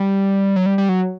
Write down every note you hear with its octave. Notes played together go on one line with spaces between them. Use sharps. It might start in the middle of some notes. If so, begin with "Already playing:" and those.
Already playing: G3
F#3
G3
G3
F#3